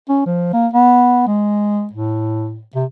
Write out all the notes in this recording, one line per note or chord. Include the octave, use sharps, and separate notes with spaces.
C#4
F3
A#3
B3
G#3
A2
C3